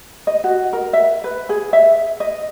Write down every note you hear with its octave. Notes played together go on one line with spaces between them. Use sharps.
D#5
F#4
A#4
E5
B4
G#4
E5
D#5